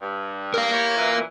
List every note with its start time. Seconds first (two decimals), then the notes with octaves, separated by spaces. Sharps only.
0.01 G2
0.54 A#4 F5
0.73 E4 G4 C#5
0.97 F#2 A#2 E3